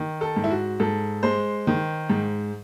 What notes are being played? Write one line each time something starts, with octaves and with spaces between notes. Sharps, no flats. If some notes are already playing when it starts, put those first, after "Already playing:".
Already playing: D#3
A4
G#2
E4
F#4
G#2 A4
G#3 C5
D#3
G#2